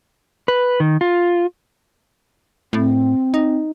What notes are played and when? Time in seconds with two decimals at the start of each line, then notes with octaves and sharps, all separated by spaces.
0.48 B4
0.80 D#3
1.01 F4
2.73 A2 C4
3.34 D#4